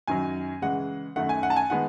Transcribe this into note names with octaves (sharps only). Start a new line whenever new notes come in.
F#2 D#3 F#3 G#5
C#3 E3 G#3 F#5
F#2 D#3 A3 F#5
G#5
F#5
A5
G#5
D#3 G#3 B3 F#5